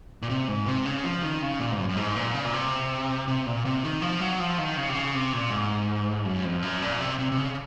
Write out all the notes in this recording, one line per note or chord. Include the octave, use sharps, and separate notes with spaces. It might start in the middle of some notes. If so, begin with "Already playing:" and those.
A#2
C3
G#2
C3
C#3
F3
D#3
C#3
A#2
G#2
F#2
F#2
G#2
A#2
C#3
A#2
C3
C3
A#2
C3
D#3
F3
F#3
F3
D#3
C#3
C3
C#3
C3
A#2
G#2
F#2
F2
F#2
A#2
C3
C3
C3
C#3